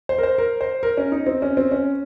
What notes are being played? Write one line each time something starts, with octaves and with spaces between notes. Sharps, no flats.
C5
A#4
C5
A#4
C5
A#4
C#4
D#4
C4
C#4
C4
C#4